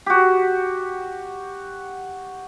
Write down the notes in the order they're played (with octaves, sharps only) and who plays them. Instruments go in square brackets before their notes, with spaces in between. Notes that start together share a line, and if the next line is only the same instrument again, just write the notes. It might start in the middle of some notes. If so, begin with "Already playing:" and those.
[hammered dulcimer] F#4 G4